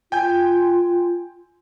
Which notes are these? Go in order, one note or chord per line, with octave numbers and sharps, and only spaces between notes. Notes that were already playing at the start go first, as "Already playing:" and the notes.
F4 G5 G#5 G6